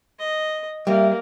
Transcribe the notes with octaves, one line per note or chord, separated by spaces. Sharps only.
D#5
G3 A#3 E5